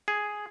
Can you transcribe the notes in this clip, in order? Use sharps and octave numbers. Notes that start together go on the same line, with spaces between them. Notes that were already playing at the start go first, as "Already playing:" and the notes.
G#4